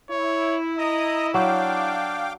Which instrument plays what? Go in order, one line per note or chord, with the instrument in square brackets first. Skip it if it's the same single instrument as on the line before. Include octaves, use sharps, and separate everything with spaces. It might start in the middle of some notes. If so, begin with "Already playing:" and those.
[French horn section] E4 [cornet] C#5
[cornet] D#5 [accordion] A#5 D#6
[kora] F#3 [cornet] D4 [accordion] F5 G5 D6